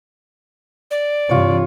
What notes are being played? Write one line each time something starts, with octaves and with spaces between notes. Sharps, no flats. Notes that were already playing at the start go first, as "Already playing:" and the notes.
D5
G2 C3 E3 F4 C#5